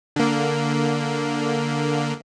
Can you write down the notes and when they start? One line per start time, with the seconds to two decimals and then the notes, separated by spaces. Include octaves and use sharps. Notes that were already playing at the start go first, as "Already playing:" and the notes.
0.16 D3 A#3